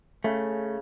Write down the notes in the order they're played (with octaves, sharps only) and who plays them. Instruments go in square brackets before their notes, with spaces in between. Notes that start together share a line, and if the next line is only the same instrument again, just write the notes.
[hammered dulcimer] C#3 [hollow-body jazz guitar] A3